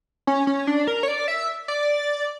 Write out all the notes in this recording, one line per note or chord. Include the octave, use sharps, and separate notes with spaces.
C#4
C#4
D4
A#4
C#5
D5
E5
D5